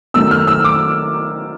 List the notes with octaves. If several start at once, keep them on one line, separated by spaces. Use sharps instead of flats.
D#3 F#3 A3 E6
F6
E6
D6